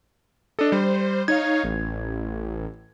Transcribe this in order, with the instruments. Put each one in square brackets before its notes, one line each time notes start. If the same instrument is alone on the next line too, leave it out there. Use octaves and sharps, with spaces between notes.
[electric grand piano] D4 A4 [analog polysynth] D#5
[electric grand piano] G3 [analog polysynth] C5
[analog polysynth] D#4 C#5 F5 [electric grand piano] G#6
[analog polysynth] A1